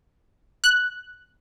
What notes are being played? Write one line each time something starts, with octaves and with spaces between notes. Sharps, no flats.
F#6